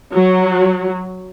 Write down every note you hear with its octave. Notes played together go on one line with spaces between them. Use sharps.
F#3